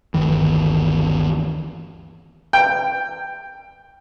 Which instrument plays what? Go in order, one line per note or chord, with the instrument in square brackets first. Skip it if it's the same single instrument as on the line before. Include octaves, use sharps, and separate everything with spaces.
[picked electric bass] G1 D2 D#3 E3
[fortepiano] G5